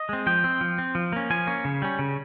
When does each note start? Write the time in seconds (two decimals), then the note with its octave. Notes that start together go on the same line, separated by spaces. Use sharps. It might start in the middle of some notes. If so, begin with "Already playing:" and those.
Already playing: D#5
0.09 G#3 C4
0.27 F3 G5
0.44 C4
0.61 F3
0.78 C4
0.95 F3
1.12 A#3 C#4
1.30 F3 G#5
1.47 A#3 C#4
1.65 C#3
1.82 G3 C#4
1.99 C#3